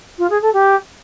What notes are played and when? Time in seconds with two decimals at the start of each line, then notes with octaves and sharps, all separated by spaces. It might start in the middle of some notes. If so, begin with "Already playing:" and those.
0.18 F4
0.30 G#4
0.41 A4
0.53 G4